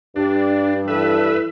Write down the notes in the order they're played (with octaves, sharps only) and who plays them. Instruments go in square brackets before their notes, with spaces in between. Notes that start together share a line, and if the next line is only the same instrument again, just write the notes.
[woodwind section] G2 [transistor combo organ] D4
[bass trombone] E3 [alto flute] A4 [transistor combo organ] B4 E5